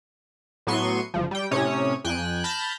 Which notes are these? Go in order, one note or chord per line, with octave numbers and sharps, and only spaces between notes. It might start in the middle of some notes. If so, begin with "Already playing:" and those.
A2 F#3 B3 C6 C#6 D#7
G1 F3
G3 G5
A2 C3 C#4 C#5 D#6
F2 G5 G#5 F#6
A5 B5 F6 G6 A6 A#6